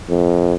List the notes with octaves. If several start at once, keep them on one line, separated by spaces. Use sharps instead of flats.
F2